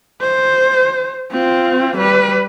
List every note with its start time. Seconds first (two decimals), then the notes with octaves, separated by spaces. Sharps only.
0.21 C5
1.31 C4 F4
1.97 G3 B4